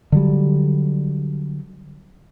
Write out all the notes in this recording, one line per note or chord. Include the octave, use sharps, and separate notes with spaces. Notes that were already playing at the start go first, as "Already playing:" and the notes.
D3 F#3 G3